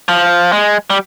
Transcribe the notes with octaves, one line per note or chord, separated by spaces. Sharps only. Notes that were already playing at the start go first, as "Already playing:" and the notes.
F3
G#3
G3